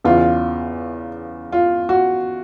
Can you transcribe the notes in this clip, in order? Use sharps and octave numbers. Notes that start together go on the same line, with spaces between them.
E2 C#3 E3 F4
F4
F#4